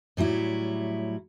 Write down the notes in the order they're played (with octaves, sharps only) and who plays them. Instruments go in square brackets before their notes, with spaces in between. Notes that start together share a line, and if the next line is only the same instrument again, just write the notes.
[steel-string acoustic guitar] A2 F#3 G3 E4